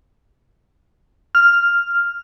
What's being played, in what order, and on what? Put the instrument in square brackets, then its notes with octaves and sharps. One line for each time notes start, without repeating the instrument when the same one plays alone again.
[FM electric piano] F6